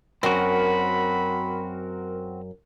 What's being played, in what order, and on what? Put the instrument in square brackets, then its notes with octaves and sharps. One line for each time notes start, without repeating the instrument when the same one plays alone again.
[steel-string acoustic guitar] F#2 [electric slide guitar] C4 F#4 [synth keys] A#4 [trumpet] B5